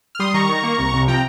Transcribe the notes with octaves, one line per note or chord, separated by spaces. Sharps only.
F6
G3 C6 D#6
D#3 A#5 C#6
D#3
A#3
C2
C3
F3 G5 A#5